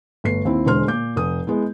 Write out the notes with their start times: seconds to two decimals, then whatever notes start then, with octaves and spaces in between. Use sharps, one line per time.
0.24 G1 A3 C7
0.45 D#2 C4 E4
0.66 E1 D3 G#3 C5 C6 F6
0.88 A#2 D6 G6
1.16 F1 D#6
1.47 G#3 B3 E4